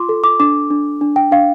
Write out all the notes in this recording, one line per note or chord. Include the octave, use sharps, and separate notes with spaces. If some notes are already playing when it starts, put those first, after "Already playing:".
Already playing: F4 C6 D6
A4
D6
D4 D6
D4
D4
G5
D4 F5